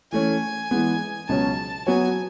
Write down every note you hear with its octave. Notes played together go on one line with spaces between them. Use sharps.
E3 A3 C#4 G#5
E3 G#3 B3
C#2 B2 F#3 C#4 A5
F#3 B3 F#4 C#5 G#5